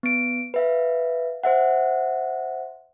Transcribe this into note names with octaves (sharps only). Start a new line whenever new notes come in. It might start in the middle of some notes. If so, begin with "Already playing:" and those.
B3 D7
B4 E5 F5
C5 E5 F#5